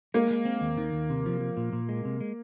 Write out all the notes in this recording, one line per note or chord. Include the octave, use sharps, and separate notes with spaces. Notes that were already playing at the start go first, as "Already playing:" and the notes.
G#3 A#3
G#3
C4
D#2
D#3
D#2
C3
F3
F3
A#2
A#2
G#3
C3
G#3